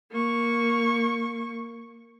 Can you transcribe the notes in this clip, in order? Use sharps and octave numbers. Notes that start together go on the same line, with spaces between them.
A#3 C#6